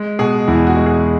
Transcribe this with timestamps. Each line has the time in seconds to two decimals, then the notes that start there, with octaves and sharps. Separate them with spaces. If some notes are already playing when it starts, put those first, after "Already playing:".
Already playing: G#3
0.19 B2 G#4
0.48 E2 E4
0.67 F#4
0.77 G#3
0.86 G#4